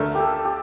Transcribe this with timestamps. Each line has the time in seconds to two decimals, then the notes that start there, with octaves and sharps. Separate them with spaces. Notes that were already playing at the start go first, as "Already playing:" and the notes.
Already playing: D2 D3 A3 A#4
0.15 G4 A4
0.45 G4